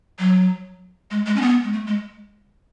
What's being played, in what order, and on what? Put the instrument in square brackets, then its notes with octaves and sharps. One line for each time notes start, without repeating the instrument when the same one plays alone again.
[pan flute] F#3
G#3
G#3
C#4
B3
G#3
A3
G#3